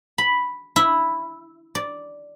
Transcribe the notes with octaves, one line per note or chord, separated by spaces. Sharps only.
B5
E4
D5